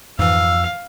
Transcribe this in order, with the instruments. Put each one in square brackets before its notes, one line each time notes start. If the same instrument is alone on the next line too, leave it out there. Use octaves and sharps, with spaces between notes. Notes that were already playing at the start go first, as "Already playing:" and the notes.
[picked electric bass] F2 [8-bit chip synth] G#2 E3 [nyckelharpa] F5 [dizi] E6